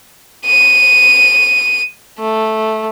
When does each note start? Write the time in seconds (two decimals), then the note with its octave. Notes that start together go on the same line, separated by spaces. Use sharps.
0.46 D#7
2.19 A3